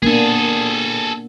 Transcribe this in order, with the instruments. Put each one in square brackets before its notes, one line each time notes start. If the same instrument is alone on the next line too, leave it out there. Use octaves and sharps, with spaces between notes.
[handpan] A#3 B3 D4 [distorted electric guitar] G#4 A4